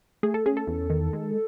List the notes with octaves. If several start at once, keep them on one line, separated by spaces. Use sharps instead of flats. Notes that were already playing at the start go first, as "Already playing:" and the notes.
A3 G#4
A4
C#4 G#4
A4
E2
D#3
G#3